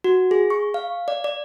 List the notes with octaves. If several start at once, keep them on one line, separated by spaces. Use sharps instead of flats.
F#4
G#4
C#6
F5
D5
D5